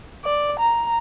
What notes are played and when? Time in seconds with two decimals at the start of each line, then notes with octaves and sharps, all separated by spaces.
0.25 D5
0.60 A#5